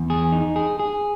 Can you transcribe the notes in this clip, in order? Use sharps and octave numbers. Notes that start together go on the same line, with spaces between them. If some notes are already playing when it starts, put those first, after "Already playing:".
Already playing: E2
G#4
D#4
G#4
G#4